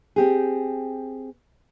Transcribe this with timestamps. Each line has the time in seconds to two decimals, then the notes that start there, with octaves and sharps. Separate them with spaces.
0.16 C4 G4 G#4